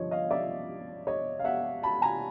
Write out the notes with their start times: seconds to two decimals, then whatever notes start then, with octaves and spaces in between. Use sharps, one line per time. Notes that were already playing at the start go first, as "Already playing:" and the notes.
Already playing: G1 G2 D3 F3 C#5 D#5
0.11 D#5 F5
0.31 D5 E5
1.07 C#5 D#5
1.39 F5
1.44 E5 F#5
1.83 A5 B5
2.02 G#5 A#5